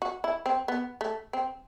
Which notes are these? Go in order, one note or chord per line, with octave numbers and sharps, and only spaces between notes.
F#4
E4
C4
B3
A3
C4